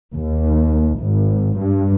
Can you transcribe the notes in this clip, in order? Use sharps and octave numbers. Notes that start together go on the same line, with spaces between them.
D#2
G#1
G2